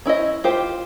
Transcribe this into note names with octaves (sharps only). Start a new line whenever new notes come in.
C#4 E4 C5 D#5
F4 G4 C5